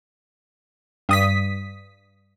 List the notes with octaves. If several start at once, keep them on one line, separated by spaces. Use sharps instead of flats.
G2 D#6 B6